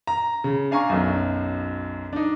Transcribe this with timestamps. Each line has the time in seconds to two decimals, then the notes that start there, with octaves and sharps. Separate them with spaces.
0.07 A#5
0.44 C#3
0.71 D4 F5 G#5 A#5 C#6
0.89 B1 F#2
2.13 D4 D#4